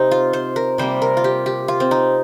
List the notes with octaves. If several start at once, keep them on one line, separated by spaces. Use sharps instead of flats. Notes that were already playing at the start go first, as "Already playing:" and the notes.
Already playing: C3 C4 D#4
F4
C5
A#4
C3 G3 A#3 C5
A#4
F4
G4
G4
F4
C4
D#4